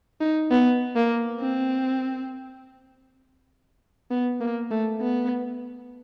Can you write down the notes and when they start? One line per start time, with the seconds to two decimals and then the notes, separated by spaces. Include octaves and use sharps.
0.21 D#4
0.51 B3
0.96 A#3
1.40 C4
4.11 B3
4.41 A#3
4.71 A3
5.01 B3